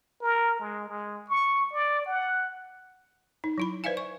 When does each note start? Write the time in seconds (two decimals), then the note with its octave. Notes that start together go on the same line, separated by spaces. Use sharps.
0.22 A#4
0.60 G#3
0.88 G#3
1.29 C#6
1.73 D5
2.06 F#5
3.44 D#4
3.58 F#3 E4 B5
3.84 B4 C5 D5 E5 F5 G#5
3.97 C#6